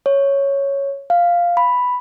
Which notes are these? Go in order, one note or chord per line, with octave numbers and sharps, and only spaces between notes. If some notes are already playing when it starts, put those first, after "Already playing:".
C#5
F5
B5